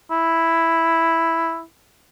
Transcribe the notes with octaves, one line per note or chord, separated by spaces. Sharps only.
E4